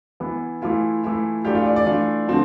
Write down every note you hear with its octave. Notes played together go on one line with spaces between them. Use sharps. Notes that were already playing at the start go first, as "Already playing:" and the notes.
E3 B3 E4
E3 A3 E4 F4
E3 A3 E4
E3 A3 D4 F4 G4
F4
D5
D5
E3 A3 D4 F4
D3 F3 A3 C4